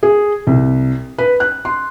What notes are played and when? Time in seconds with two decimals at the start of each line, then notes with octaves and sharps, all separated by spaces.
0.03 G#4
0.47 C2
1.18 B4
1.40 F#6
1.65 C6